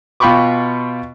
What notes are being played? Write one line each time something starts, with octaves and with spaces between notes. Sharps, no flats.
B2 F4 G5 B5 C#6 D6